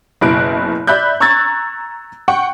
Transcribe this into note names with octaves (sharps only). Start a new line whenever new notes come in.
F#1 B2 E4 F#6 D7
D5 E5 B5 F#6 G6
A#5 C#6 E6 F#6 G#6 A6
F#5 G5 C#6